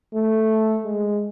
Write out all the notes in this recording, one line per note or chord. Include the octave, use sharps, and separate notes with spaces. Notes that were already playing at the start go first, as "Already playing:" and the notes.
A3
G#3